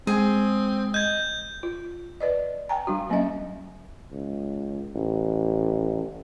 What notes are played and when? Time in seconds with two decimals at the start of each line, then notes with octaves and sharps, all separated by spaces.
0.07 G#3 C4 G#4
0.94 D#5 G6 G#6
1.63 F4
2.21 B4 D5 D#5
2.69 G5 G#5 A#5
2.87 G3 D4 F#4
3.09 F#3 A#3 B3 C#4 D#5 E5
4.11 C#2
4.95 A1